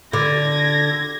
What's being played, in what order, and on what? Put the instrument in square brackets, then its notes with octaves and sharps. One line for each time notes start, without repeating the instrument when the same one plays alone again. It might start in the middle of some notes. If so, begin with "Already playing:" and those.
[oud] D3 [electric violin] G#6 A#6